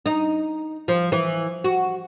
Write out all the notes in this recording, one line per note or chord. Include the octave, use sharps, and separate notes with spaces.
D#4
F3
E3
F#4